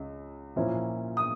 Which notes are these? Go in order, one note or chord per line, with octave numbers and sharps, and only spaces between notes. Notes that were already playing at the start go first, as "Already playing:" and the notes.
Already playing: C#2
A#2 F3 A#3 C#4 E4
D#6